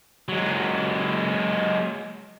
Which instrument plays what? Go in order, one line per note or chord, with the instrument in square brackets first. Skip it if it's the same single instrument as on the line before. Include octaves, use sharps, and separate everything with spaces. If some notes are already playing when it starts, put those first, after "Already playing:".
[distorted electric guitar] F#3 G#3